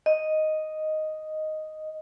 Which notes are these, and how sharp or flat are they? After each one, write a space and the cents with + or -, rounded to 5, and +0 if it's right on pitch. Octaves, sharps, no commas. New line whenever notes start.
D#5 +0